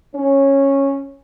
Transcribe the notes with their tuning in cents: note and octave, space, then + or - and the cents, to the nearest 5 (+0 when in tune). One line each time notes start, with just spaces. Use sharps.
C#4 -10